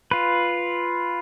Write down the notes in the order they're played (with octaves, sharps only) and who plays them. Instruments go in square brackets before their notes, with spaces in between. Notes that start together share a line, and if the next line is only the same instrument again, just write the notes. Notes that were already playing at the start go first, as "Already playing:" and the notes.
[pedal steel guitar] F4 B4